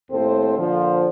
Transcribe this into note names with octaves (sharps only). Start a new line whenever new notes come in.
D#2 A2 C4 A4 C5
A#2 D3 F3